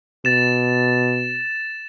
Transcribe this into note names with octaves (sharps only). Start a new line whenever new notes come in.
B2 A6 E7